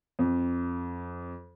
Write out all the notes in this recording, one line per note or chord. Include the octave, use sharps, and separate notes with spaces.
F2